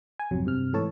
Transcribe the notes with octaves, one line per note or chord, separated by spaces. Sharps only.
G#5
G#1 F2 C3 F#3
G2 C3 F6
G#2 E3 A3 A4 C#5 A5